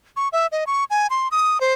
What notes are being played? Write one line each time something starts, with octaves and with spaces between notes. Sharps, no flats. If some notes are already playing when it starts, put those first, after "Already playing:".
C#6
E5
D#5
C#6
G#5
C6
D#6
C5